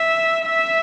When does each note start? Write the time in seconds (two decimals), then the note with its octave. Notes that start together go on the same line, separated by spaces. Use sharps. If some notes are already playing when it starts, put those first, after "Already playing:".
Already playing: E5
0.46 E5